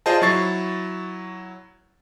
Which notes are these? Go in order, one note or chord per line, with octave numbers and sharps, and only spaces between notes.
F4 G#4 C5 D5 D#5 A5
F#3 E4 C#6 A6 C7